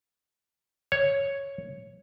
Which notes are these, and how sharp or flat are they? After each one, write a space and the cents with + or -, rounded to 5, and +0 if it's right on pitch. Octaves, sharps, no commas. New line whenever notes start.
C#5 +0